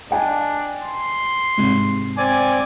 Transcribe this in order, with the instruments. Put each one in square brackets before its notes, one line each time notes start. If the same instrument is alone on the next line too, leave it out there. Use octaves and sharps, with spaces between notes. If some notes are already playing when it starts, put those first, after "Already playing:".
[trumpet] D4 [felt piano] D#5 G5 G#5
[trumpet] C6
[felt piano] G#2 C3
[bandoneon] C4 D5 D6 [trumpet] G#5